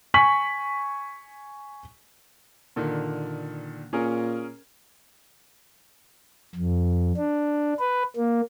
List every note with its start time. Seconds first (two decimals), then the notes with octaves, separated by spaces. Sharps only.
0.14 G#5 C#6 B6 F#7
2.76 A#2 D3 D#3
3.93 A#2 C#4 G#4 A#4
6.55 F2
7.17 D4
7.80 B4
8.16 A#3